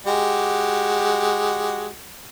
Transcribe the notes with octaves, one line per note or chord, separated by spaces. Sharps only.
G#3 F#4 G4